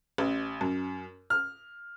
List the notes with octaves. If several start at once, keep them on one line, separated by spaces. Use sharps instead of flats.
A1
F#2
F6